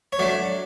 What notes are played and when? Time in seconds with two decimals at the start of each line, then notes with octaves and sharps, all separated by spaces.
0.13 C#5
0.19 F#3 A3 D4 D5